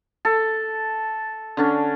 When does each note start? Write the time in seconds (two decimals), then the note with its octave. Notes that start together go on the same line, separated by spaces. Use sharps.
0.25 A4
1.57 D3 C#4 D4